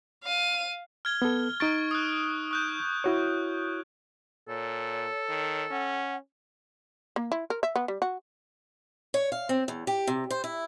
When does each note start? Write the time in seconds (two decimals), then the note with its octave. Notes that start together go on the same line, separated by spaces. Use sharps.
0.24 F5 D#7
1.05 F6 G#6 G7
1.22 B3 A4
1.60 D#4 C#6 A6 D7
1.91 D#6 F#6
2.51 C#6 F#6 G6
3.04 E4 F#4 C#5
4.48 A#2 A4 C#5
5.29 D#3
5.71 C#4 F#5
7.16 A#3
7.32 E4
7.50 A#4
7.63 E5
7.76 B3
7.88 G3
8.02 F#4
9.14 C#5
9.32 F5
9.49 C4
9.68 E2
9.87 G4
10.07 C3
10.30 C5
10.44 E4